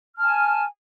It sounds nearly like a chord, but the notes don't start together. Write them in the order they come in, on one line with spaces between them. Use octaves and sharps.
F6 A5 G#5